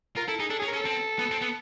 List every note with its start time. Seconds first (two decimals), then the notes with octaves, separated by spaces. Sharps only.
0.16 F4 A#4
0.28 E4 A4
0.40 D#4 G#4
0.50 D4 A4
0.59 C#4 G#4
0.68 A#4
0.73 C#4
0.76 A4
0.85 C4
1.19 B3
1.31 C4
1.41 B3